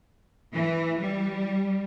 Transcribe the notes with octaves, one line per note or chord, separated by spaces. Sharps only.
E3
G3